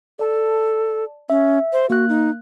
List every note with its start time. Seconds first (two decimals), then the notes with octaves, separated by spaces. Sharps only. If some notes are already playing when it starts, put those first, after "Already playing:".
0.19 A4 D5 A5
1.30 C#4 E5
1.73 C5
1.90 A#3 F#4 F#6
2.09 D#4